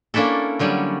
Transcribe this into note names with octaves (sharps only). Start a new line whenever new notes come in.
A#3 C#4 D4 E4 A4
D3 F#3 G3 C#4